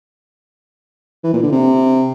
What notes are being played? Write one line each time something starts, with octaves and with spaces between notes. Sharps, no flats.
E3
A#2
D3
C3